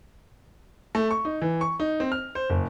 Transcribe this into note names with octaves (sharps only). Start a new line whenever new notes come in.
A3
C#6
D#4
E3
C#6
D#4
C4
F6
C5
F#1